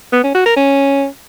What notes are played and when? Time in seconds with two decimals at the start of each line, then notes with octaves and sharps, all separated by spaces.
0.13 B3
0.24 C#4
0.35 F#4
0.46 A#4
0.57 C#4